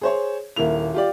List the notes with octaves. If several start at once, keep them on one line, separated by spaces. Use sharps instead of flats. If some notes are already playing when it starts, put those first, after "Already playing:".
G#4 C5 C#5
D#1 A#3 E4 F7
F4 G4 D5